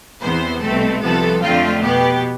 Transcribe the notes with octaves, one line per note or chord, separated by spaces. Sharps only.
E2 C3 E3 B3 C5
C2 B2 A3 C4 A4
C2 C3 F3 B3 A4
F2 D3 A3 C4 F4
B2 B3 G4